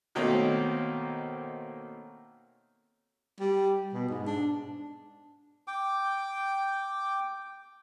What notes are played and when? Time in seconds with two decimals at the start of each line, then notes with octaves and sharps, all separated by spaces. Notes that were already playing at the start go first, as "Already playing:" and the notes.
0.15 B2 D#3 A3 A#3 C4 C#4
3.41 G3
3.93 B2
4.09 G#2
4.27 D4
5.68 G5 D6